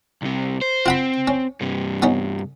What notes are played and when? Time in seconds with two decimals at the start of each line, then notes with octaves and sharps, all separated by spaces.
0.22 C2 C3
0.62 C5
0.86 C4 F4 F#5 B5
1.28 C#4
1.61 G2 C3
2.02 B3 C#4 D#4